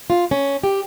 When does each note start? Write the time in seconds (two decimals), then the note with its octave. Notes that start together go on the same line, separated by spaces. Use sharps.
0.10 F4
0.31 C#4
0.63 G4